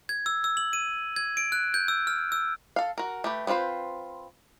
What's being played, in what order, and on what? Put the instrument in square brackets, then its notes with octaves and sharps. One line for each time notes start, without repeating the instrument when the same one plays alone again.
[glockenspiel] G#6
E6
E6
F#7
D#7
G#6
D7
F#6
G6
E6
F6
E6
[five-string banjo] A4 F5
F#4 A#4
A3 G4 B4
B3 C4 F4 B4 C5